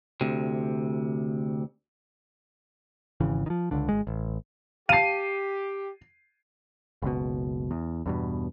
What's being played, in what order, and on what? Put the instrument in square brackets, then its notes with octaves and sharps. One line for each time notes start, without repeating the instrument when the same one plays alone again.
[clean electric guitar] D2 C3
[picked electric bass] G#1 C#3 E3
D#3 F3
C#2 D3
G#1 G#3
A1
[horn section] G4 [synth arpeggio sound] F5 A5 [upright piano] C7 D#7
[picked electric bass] F#1 C#2 B2
E2
E2 G2 B2